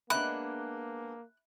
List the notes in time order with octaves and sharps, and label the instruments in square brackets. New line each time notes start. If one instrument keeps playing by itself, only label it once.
[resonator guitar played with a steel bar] G#3 B3 D4 [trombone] A#3 [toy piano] E5 B5 [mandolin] F#6